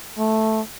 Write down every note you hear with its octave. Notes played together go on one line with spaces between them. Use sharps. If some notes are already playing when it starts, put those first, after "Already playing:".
A3